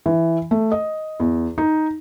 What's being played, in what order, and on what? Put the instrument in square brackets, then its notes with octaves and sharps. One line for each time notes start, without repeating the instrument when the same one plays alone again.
[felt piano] E3
A3
D#5
E2
D#4